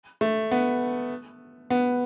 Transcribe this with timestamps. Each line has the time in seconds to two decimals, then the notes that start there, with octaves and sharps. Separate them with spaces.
0.21 A3
0.51 B3
1.70 B3